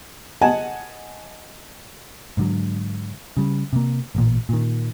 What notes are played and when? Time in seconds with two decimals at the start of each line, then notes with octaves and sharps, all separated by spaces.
0.41 D#5 F#5 G#5 A5
2.37 G#2 D3 F#3
3.37 C#3 G3
3.73 C3 A#3
4.15 A1 A#2
4.49 A#2 D#3